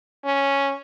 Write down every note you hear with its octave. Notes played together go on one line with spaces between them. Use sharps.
C#4